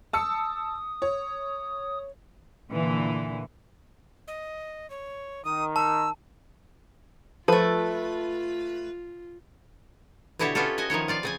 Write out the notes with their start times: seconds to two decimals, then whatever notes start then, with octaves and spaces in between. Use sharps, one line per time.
0.13 A5 D#6 E6 C#7
1.02 C#5
2.72 A#2 D3 E3
4.27 D#5
4.90 C#5
5.45 D#3 D#6
5.76 A5 E6
7.48 F3 A3 F4 A4 B4
10.39 B2 D3 E4 G4 C#5 A5
10.55 B3 C#4 E4 F4 G4 A4
10.78 F#4 D#5 G#5
10.90 D#3 F3 E4 C#5
11.08 F4 D5 F5
11.23 C#3 C4 G#5